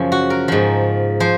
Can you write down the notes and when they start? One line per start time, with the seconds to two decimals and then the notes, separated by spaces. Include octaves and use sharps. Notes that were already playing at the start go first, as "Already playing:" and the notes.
Already playing: F#2 C#3 F3
0.12 F#4
0.30 A#4
0.48 G#2 F3
1.20 F3 C5